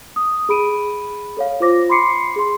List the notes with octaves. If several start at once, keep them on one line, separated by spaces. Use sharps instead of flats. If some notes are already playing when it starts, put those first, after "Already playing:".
D#6
G#4 B5 D7 D#7
A4 C#5 F5
F4 C5 D6 A#6
B5 C6 D6 C7 C#7
G#4 C6